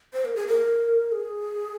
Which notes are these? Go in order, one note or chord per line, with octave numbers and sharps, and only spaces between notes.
C5
A#4
G#4
A#4
G#4